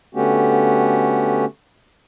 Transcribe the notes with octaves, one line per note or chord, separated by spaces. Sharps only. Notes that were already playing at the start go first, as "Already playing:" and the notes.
D3 A3 B3 C#4 F#4 G4